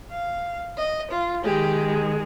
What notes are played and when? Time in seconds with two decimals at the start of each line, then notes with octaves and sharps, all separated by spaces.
0.10 F5
0.77 D#5
1.10 F4
1.44 D#3 G#3 G4